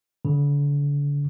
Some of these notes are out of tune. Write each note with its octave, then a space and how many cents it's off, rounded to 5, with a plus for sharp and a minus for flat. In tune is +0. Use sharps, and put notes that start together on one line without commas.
D3 -40